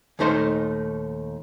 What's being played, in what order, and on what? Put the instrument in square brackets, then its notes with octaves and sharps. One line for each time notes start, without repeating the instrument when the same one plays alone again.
[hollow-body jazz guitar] D#2 A#2 A3 D#4 C5 C6